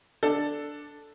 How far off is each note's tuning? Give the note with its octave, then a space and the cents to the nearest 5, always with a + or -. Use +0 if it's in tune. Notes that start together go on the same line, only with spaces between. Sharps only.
D4 +0 A4 +0